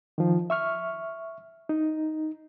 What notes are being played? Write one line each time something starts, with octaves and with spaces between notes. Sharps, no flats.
D#3 F3
E5 C#6 F6
D#4